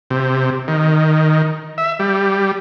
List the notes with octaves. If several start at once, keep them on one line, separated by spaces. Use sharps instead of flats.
C3
D#3
E5
G3